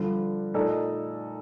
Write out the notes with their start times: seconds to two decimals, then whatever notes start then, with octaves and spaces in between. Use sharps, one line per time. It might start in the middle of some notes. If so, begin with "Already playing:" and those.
Already playing: G2 D3 F3
0.54 A#2 A3 D#4 A4 D5